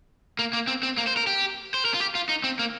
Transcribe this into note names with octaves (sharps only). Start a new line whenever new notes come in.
A#3
A#3
C4
C4
A#3
C5
A#4
G4
C5
A#4
F4
G4
F4
D#4
C4
A#3